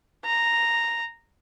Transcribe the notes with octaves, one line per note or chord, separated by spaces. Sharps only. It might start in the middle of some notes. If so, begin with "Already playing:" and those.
A#5